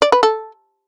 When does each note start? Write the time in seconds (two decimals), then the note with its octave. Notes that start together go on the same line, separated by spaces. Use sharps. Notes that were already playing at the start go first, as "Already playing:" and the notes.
0.02 D5
0.12 B4
0.23 A4